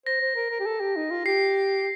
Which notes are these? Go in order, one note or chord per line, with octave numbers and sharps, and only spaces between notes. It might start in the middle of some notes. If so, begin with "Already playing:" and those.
C5 A#6
C5
A#4
A#4
G4
A4
G4
D#4
F4
G4 C7